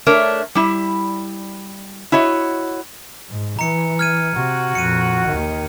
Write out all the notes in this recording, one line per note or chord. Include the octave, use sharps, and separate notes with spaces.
A3 D4 A#4 C#5
G3 E4
E4 F#4 C#5 D#5
G#2
E3 A#5 C#7
F6 G#6 D#7
C3 F#4
F2 A#2 C#7 D#7
D#2 D#3